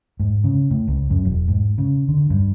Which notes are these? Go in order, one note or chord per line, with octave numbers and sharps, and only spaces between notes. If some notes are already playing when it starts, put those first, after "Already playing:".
G#2
C#3
A2
C#2
F#2
E1
G#2
C#3
D3
G2